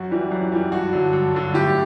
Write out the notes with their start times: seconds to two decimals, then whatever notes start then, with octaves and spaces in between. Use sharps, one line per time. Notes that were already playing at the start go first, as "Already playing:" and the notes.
Already playing: F#2 F#4
0.11 E3 G3
0.31 F#2
0.52 E3 G3
0.72 G2 F#4
0.93 D3 F#3
1.13 G2
1.34 D3 F#3
1.54 A2 G4